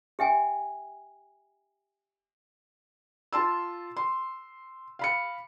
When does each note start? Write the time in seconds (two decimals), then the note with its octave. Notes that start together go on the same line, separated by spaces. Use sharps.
0.19 G4 E5 G5 G#5
3.33 F4 A5 C6 E6
3.97 C6
4.99 F5 B5 C#7